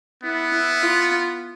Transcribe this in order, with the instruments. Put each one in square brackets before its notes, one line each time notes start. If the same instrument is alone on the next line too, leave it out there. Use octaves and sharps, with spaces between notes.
[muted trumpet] B3 [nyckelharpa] E4
[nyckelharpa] E4
F4